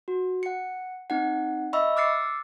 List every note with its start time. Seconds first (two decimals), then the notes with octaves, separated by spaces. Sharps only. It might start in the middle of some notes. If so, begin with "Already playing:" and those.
0.08 F#4
0.43 F#5 C#7
1.10 C4 D#4 F#5
1.73 D#5 E5 B5 C#6 E6
1.97 D6 E6 F6 A6 C7 C#7